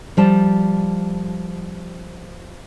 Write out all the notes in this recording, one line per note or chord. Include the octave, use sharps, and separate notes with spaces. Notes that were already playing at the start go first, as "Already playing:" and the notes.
F3 G3 A5